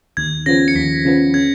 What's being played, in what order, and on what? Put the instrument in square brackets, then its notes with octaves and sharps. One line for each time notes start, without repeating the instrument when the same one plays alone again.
[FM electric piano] D#2 [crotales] G#6
[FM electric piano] C#3 F3 B3 [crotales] A#6
[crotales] C#7
[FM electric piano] D#2 [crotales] B6
[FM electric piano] C#3 F3 B3
[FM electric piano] C#3 [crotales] G#6